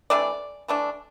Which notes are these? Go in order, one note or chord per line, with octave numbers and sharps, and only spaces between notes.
C3 E3 A3 D4 D5
E3 A3 D4